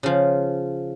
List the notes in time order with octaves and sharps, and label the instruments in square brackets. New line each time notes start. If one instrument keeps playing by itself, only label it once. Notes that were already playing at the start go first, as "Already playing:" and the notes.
[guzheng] C#3 F3